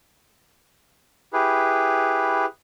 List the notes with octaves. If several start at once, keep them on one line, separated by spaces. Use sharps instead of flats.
E4 G4 G#4 B4